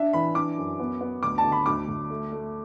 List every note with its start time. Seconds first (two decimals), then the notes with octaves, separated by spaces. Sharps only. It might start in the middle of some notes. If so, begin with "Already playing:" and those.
Already playing: D4 E5
0.13 E3 B5
0.35 D4 D6
0.57 F#2
0.80 B3
1.01 B3
1.23 D2 D6
1.38 A5
1.44 D3
1.52 B5
1.66 D2 D6
1.88 D2
2.10 A3
2.32 A3